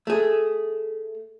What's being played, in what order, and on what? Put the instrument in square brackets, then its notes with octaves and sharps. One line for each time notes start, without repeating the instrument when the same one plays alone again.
[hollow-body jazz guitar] A3 G#4